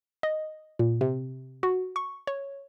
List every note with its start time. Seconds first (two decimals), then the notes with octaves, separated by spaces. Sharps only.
0.23 D#5
0.79 A#2
1.01 C3
1.63 F#4
1.96 C#6
2.27 C#5